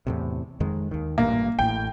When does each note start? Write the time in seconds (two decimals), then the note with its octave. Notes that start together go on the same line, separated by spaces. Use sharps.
0.07 E2 A2 C3
0.60 F2 D#3 G#3
0.91 D#2 D#3
1.18 A1 G2 A#2 A#3
1.59 A1 A2 G5